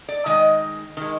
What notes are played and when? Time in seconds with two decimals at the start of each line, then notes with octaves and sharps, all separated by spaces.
0.09 D5
0.26 D#3 G#3 D#5
0.97 D#3 G#3